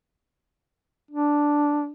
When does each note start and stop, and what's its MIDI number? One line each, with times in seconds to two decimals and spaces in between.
1.11 1.92 62